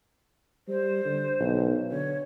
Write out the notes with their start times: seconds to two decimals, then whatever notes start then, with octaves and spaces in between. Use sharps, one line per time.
0.68 G3 C5
1.05 D3
1.40 B1
1.91 D3 C#5